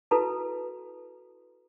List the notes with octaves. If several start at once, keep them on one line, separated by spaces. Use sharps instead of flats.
E4 F#4 A4 B4 A5 A#5